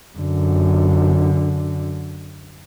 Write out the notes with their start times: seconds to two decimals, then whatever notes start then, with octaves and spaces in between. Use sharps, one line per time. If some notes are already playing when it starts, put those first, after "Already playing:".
0.19 F#2 D3